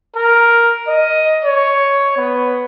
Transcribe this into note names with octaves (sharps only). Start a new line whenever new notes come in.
A#4
D#5
C#5
B3